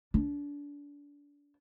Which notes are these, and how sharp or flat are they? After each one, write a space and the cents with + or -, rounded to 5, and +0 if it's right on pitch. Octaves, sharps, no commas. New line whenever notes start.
D4 -30